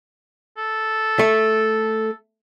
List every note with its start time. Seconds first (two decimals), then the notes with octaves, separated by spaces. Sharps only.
0.57 A4
1.19 A3